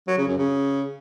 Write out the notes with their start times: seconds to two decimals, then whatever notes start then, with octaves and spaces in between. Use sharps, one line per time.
0.07 F#3
0.17 C#3
0.27 F#2
0.38 C#3